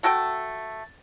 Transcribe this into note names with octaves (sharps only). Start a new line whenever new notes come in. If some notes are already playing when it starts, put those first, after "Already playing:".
A3 F#4 A4 G5